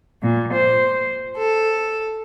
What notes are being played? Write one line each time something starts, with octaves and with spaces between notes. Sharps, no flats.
A#2
C5
A4